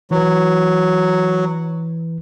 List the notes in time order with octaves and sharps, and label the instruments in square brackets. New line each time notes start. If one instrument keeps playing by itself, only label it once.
[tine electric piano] E3 B4 [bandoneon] F#3